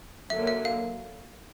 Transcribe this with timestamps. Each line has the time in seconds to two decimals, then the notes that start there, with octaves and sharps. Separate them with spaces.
0.30 D3 F#3 A#3 E5
0.47 E5
0.65 F5